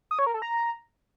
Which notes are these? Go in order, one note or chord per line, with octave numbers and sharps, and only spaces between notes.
D#6
C#5
A#4
A4
A#5